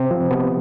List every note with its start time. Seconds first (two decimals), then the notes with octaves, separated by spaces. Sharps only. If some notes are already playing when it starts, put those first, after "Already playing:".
Already playing: C3 C4
0.11 F3
0.31 C3 B3